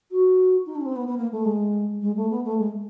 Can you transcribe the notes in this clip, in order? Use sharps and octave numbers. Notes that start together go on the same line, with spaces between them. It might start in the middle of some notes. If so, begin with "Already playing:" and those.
F#4
D#4
D4
C#4
C4
B3
B3
A#3
A3
G#3
G#3
A3
B3
A3
G#3